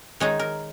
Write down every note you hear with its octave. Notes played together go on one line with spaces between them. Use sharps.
D#3 G#3 D#4 C#5
A#4